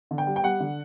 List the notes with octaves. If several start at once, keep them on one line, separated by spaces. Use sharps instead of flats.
D3
G5
G3
G5
G3 F#5
D3